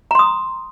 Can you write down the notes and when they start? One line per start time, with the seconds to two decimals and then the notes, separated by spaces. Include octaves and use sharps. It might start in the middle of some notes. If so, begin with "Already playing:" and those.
0.11 A#5
0.15 C6
0.19 D#6